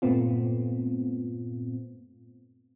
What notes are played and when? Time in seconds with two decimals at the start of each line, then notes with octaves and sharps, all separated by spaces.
0.02 G2 A#2 A3 B3 C4 F4